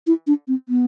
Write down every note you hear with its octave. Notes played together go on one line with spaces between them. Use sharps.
E4
D4
C4
B3